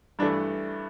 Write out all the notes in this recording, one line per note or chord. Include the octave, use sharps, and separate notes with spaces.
G2 E3 A3 D4